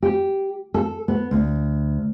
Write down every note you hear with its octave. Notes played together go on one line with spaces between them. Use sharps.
G4
A4
B3
D2